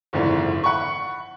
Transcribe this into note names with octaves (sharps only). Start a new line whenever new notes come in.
F#1 F2 G#2 D3 E3
F#5 B5 C#6